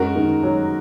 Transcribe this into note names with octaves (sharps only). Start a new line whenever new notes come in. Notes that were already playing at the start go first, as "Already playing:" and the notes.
Already playing: F#2 G#3 F#4 A#4
D#3
F#3